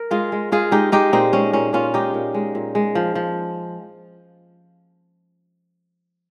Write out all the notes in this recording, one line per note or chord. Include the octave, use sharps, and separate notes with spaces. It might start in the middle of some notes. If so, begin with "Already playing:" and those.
Already playing: A#4
G#3 F4 G#4
G#3
G#3 F4 G#4
G#3 D#4 G4
G#3 D#4 G4
A#2 C4 D#4
G#3 C#4
A#2 C#4
A#2 C#4 F4
G#3 D#4 G4
A#2
G#3
A#2
G#3
F3
F3